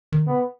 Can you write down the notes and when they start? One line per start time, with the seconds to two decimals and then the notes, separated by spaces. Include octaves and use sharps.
0.12 D#3
0.26 C#3 B3